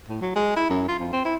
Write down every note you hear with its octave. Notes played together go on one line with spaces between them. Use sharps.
A2
F#3
G#3
E4
F#2
F4
F2
C4
E4